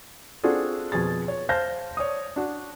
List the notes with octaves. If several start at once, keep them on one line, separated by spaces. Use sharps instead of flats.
C4 D4 F4 F#4 G#4 A4
F2 B2 G#4 A6
C#5
C5 F5 A5 G6 A#6
C#5 D5 D#6
D4 F#4